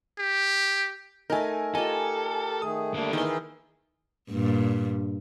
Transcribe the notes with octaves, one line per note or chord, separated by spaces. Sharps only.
G4
A3 D#4 A#4 G#5
F4 G4 A4 A#4 D#5 G#5
D#3 A3 G#4 D#6
D3 G3 A3 A#3 D4
D#3 E3 G#4 A#4 E5 C6
G2 A#2